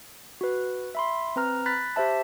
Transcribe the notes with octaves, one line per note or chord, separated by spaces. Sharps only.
F#4 B4
E5 B5 C6
C4 B4 A#5 F6
B5 F#6 A6 B6
G4 C5 E5 A5